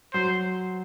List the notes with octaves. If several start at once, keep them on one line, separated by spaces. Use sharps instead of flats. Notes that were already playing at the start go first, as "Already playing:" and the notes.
F#3 C5